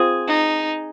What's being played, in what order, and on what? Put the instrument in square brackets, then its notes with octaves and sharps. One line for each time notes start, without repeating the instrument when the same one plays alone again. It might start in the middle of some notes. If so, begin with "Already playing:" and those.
Already playing: [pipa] C4 F4 G#4
[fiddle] D#4